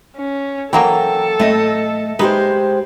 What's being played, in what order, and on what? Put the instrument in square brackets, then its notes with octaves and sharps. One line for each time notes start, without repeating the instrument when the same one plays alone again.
[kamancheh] C#4
[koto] E3 F#3 A#3 [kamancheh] A4 [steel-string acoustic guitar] G5
[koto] A2 [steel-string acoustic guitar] A3 D#5
[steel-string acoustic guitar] G#3 G4 C5 [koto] D#4 B4